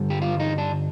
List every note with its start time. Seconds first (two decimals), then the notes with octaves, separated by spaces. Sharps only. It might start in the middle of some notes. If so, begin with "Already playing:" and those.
Already playing: G2 D3 G3
0.10 G4
0.22 F4
0.40 D#4
0.58 D4